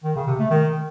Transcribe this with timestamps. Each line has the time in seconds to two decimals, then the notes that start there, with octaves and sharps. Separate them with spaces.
0.04 D#3
0.16 C#3
0.27 C3
0.39 A3
0.50 D#3